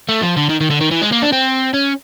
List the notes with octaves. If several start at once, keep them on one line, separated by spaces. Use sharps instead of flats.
A3
F3
D3
D#3
D#3
D3
D#3
E3
G#3
A#3
D4
C4
C#4